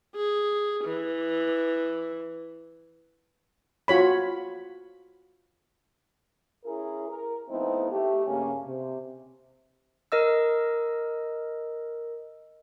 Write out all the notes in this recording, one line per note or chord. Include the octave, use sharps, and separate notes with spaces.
G#4
E3
F4 F#4 C#5 B5
C#4 E4 G#4 A#4
A#4
F3 A3 B3 C4 D#4 E4
A3 G4
G2 C#3 A#3 C#4
C3
A#4 D#5 E6